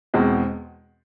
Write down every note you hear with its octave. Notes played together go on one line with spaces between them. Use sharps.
E2 B2 G#3 C4